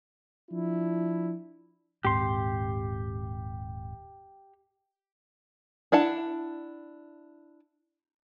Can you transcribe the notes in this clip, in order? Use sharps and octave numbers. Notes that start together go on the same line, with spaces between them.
F3 D4 E4
D#1 G#2 C4 G4 C6
D4 E4 F#5 A5